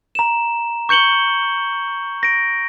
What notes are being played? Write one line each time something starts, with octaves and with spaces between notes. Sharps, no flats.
A#5 E7
C#6 G6 C#7 F#7 G7
A#6 D7